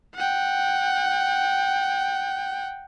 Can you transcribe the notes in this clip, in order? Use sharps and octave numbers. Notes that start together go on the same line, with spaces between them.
F#5 G5